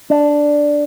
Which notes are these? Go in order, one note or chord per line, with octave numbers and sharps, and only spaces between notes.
D4